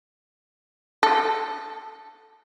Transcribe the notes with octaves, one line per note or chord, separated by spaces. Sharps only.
A4